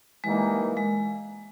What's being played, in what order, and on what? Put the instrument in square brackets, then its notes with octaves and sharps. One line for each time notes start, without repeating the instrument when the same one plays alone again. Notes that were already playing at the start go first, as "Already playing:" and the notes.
[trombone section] E3 G3 A#3 D#4 [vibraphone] G#3
[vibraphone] G#3